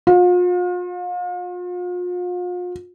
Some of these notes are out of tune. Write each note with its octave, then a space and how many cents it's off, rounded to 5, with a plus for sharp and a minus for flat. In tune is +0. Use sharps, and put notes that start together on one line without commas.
F4 +40